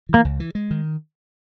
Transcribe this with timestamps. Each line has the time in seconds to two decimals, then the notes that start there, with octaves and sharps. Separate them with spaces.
0.09 E3 A#3
0.25 C#2
0.40 E3
0.55 G#3
0.71 D#3